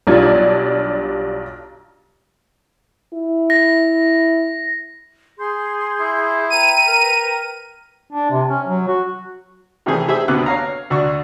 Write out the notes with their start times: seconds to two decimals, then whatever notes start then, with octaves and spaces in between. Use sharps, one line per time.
0.07 B1 G3 D4 F4 G#6
3.14 E4
3.50 A#6
5.38 G#4 C6 G6
6.00 E4
6.50 B4 G5 A#5 D#7
6.87 A#4
8.13 D4
8.31 C3
8.49 C#4
8.66 F#3
8.87 F#4
9.86 C3 D#3 E3 A3 G#4 C5
10.08 G4 G#4 C5 E5
10.28 D2 D3 B3 F#4 D6 F#6
10.46 C#5 F5 A#5
10.90 D2 D4 F#4 C#6